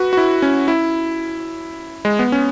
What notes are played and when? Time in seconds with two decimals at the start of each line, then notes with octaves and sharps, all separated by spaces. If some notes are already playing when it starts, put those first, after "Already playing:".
Already playing: F#4 B4
0.13 F#4
0.17 E4
0.42 C#4
0.68 E4
2.05 G#3
2.19 B3
2.32 C#4